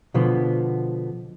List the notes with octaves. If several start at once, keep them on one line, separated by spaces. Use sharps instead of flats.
B2 D3 F3 B3